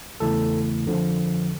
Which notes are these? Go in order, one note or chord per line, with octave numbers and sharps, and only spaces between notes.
E2 C#3 E3 A3 E4 A4
F2 D3 F3